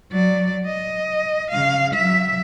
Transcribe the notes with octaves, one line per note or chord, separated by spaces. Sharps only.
F#3 D5
D#5
C#3 F5
F#3 E5